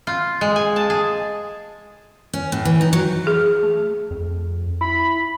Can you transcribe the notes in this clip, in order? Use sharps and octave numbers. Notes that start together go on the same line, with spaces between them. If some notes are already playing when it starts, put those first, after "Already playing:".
F4
G#3
G#5
A5
G#4
C#4
A2
E3
D#4
F#3
G#4
A3
F2
E4 B5